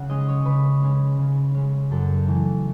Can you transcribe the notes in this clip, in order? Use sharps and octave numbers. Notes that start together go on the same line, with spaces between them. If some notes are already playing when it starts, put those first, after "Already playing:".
Already playing: C#3 F#5
G#3 C#4 D#5
C#5
C#3 B4
G#3 C#4
C#3
G#3 C#4
F#2 A4
E3 A3